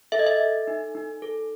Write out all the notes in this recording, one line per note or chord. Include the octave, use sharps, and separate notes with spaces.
A4 E5
D#5
E5
A4
D#4
D#4
A4